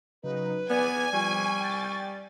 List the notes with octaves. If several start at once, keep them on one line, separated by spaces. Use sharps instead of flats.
C#3 F#3 D#4 B4
B3 D5 G#5
F3 G3 C#6
G5 A6